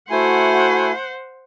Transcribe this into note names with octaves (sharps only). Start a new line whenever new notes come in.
A3 E4 F#4 C5 F#5 G#5